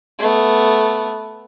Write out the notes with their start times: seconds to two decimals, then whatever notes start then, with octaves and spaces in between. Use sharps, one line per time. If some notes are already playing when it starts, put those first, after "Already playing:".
0.19 A3 B3